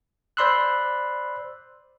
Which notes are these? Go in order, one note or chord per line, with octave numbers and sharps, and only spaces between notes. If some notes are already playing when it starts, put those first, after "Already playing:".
C5 D5 B5 C6 E6 F#6